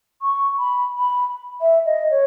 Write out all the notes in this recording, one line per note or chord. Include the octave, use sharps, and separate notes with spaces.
C#6
B5
B5
E5
D#5
C#5